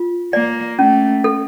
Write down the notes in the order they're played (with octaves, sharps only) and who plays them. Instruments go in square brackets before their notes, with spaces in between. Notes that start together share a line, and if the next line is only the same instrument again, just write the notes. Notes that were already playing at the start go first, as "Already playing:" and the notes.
Already playing: [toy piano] F4
[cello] A#3 [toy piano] D5
[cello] A3 [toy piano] C#4
[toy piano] A4